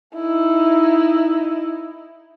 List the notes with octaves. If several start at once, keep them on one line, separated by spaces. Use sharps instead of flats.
D#4 E4